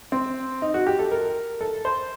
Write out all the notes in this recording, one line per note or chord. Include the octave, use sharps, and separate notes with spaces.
C4
D#4
F#4
G4
A4
A#4
A4
C5